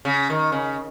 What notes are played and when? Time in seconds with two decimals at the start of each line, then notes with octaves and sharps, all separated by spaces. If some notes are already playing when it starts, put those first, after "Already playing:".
0.05 C#3
0.30 D#3
0.52 C#3